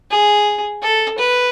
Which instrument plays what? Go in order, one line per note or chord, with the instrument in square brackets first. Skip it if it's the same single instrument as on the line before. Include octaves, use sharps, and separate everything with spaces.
[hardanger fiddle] G#4
A4
B4